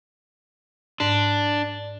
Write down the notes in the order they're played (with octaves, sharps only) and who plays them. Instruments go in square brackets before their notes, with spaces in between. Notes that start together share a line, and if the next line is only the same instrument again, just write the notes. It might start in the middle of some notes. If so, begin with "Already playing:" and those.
[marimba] G#2 [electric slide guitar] D4